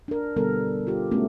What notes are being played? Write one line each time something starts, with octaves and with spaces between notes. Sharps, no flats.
D4 A#4
B2 D3 G3 B3 A4 A#4
F4 G4
G#3 A3 B3 C#4 F#4